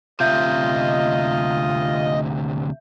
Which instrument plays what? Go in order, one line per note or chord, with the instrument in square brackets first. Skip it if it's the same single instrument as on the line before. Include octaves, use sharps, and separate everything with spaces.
[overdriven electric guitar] D2 C3 [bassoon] F4 [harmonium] D#5 [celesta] E5 G6